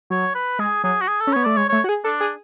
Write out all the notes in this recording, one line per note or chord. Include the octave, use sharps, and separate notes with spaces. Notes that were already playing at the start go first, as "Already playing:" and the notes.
F#3 C#5
B4
G#3 G#4
F#3 G#4
F#4
G#4
A4
C#4
B3 C#5
A3 D5
G#3 C#5
A3 C#5
F#4
G#4
D4 A4
G#4